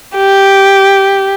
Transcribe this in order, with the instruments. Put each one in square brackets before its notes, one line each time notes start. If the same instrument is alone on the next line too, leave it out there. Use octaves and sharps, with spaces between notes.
[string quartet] G4